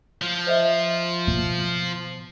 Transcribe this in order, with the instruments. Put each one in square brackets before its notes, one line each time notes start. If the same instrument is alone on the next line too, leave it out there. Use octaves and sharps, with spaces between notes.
[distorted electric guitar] F3
[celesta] C5 D#5 E5
[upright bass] B2